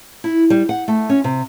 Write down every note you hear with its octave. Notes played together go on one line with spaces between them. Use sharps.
E4
G3
F#5
A3
C#4
C3